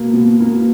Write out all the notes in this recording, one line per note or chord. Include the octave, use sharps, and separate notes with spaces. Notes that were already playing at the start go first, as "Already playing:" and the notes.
Already playing: B2 A#3
B2
A#3